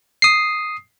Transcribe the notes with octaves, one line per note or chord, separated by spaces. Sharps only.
D#6 C7